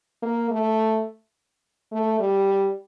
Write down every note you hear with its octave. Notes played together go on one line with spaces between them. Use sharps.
A#3
A3
A3
G3